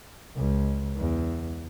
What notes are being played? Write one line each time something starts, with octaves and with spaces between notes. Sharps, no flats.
C#2
E2